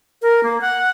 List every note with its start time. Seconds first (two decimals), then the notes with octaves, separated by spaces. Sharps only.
0.22 A#4
0.43 A#3
0.61 F#5